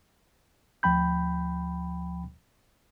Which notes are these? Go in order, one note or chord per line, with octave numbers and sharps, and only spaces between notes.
D2 F3 G5 B5 G6